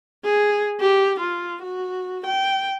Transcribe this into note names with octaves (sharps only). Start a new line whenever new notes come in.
G#4
G4
F4
F#4
G5